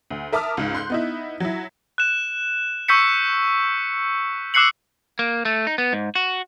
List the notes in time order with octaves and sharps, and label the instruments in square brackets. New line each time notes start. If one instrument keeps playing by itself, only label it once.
[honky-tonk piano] D2
A#4 E5 A5 D6 D#6 F6
C#2 G#2
C6 F#6 G6
B3 D#4 E4
F#3 E4
[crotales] F#6 E7
C#6 E6 G6 B6 C#7
D6 E6 F#6 C7 C#7 F#7
[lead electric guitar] A#3
A3
D#4
B3
G#2
F#4